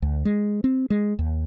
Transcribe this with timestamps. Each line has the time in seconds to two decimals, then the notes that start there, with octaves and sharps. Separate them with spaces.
0.02 D2
0.25 G#3
0.64 C4
0.90 G#3
1.19 D#2